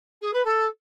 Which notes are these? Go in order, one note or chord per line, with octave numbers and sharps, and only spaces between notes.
G#4
B4
A4